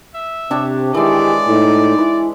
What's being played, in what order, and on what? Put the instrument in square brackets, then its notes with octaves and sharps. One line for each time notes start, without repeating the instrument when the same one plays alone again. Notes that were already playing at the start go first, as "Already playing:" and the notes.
[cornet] E5
[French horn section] C3 [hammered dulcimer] D4 G4 C#5
[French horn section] D#3 E4 G4 [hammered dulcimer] E3 G#3 [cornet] D5
[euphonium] A2 [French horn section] D#4
[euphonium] E4 [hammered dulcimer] B4